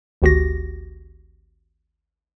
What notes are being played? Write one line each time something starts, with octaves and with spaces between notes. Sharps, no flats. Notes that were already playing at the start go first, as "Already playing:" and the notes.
G#1 D2 F#4 G4 A#6